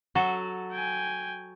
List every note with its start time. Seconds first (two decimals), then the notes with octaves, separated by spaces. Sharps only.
0.15 F#3 F#4 A4
0.73 G5 G#5